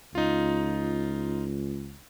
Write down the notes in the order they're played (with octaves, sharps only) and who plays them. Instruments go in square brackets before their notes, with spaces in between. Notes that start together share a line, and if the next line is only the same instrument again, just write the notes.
[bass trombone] C#2 [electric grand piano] D#4 F4